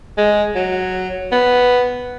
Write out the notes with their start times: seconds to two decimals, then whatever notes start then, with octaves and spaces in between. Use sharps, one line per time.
0.17 G#3
0.55 F#3
1.32 B3